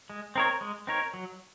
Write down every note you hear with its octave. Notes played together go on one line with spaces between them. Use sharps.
G#3
C4 D#4 A#4 C#5
G#3
C4 D#4 A#4 C#5
F#3